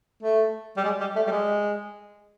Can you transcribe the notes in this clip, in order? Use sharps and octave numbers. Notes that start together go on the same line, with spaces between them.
A3
G3
G#3
G3
A3
G3
G#3